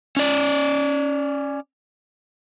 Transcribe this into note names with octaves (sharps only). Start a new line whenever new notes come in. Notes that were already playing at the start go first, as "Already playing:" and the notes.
C#4 D5